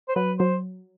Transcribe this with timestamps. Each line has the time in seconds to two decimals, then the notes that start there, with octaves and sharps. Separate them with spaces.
0.08 C5
0.16 F#3 B4
0.39 F#3 C5